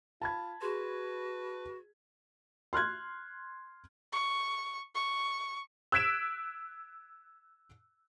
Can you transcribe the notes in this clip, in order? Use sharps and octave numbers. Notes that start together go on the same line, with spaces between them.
F4 A5 B5 G#6
F#4 G#4 B4 C6
C6 F6 F#6 G#6
C#6
C#6
E6 F#6 G#6 B6 D7 E7